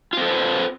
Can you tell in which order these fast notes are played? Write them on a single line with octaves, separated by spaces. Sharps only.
F4 C4 A4 C5 B4